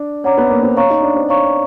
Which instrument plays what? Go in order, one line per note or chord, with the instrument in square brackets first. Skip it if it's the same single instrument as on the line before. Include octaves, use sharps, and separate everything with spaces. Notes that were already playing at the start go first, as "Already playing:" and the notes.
Already playing: [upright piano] D4
[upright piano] C#4 [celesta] C#5 F#5 A#5 D6
[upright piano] B3
A#3
C4
[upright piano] C#4 [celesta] C#5 F5 A#5 C#6
[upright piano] D#4
D4
C4
[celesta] C#5 F5 A#5 C#6